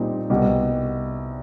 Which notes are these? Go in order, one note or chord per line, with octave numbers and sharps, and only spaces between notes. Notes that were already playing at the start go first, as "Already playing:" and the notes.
Already playing: A#2 G3 C4 D#4
C2 B2 G3